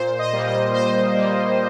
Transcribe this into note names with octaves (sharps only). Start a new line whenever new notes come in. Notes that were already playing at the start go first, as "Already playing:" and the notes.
Already playing: A#2 C5
D#5
G3 A#3
D#5
A#2 C5
G3 A#3